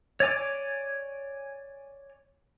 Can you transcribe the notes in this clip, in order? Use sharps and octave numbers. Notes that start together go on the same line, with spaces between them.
C#5 D5 G#5 D6